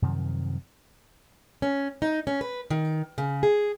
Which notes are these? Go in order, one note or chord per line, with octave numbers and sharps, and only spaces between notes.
F#2 C3 D#3 F3
C#4
D#4
C#4
B4
D#3
C#3
G#4